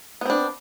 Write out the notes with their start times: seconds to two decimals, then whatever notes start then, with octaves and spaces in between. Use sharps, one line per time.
0.21 B3
0.26 C4
0.30 D4